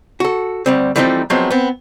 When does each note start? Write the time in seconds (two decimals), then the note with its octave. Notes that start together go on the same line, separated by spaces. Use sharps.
0.20 F#4 A4
0.66 D2 G3 C4
0.96 E3 F3 G3 A3 C4 D#4
1.30 F3 F#3 G#3 B3 C4
1.51 B3 C4